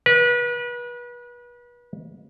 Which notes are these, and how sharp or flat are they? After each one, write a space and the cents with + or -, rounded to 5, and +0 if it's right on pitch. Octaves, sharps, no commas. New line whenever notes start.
B4 -35